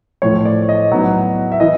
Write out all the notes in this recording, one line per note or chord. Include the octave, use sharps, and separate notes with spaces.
A2 F3 A3 C#5
D5
D#5
A2 F#3 B3 D#4
E5
E3 D#5